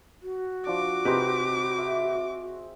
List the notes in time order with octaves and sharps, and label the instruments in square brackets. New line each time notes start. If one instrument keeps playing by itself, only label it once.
[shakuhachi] F#4
[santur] F3 D4 [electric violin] D6
[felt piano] C3 G4 B4 [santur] C4 D#4 G#4
[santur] E5